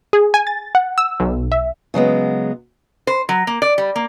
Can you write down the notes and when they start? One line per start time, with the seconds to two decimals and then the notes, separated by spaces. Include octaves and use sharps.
0.13 G#4
0.34 G#5
0.47 A6
0.75 F#5
0.98 E6
1.20 B1
1.52 E5
1.94 C#3 F#3 G#3 B3
3.07 C5
3.29 F#3
3.47 A#3
3.62 D5
3.78 G3
3.96 A#3